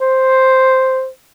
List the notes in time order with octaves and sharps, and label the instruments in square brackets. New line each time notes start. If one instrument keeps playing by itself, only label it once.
[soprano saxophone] C5